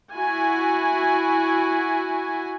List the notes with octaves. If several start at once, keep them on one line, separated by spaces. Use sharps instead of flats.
E4 F#4 G#5